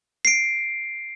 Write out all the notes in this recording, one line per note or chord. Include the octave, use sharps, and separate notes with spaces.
C7 D7